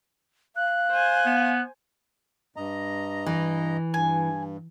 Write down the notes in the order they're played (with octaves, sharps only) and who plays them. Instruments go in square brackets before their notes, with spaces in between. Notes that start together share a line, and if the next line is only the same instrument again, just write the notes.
[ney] F5 [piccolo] F#6
[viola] C5 G#5
[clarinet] B3
[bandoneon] G2 D#5 A#5
[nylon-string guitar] E3
[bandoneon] G2 [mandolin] G#5